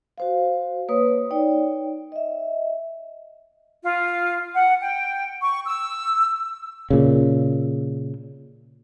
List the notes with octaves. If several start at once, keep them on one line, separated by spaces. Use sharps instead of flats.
F#4 C5 F5
A#3 B4 C#5 D#6
D#4 C#5 D5 G5
D#5 E5
F4
F#5
G5
C#6
E6
A#2 C#3